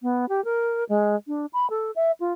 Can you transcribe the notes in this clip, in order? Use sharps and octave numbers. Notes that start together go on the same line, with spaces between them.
B3
G4
A#4
G#3
D4
B5
A4
E5
F4